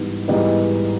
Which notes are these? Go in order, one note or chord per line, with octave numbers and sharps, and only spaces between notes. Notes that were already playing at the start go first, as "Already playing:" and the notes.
Already playing: G#2 E3 G3 B3 D#4
G#2 E3 G3 B3 D#4